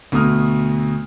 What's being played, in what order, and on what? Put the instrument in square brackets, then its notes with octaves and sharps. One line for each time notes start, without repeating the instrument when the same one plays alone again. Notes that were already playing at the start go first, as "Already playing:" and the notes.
[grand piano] D2 B2 A3 D#6 F6